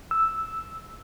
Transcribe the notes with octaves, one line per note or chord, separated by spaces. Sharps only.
E6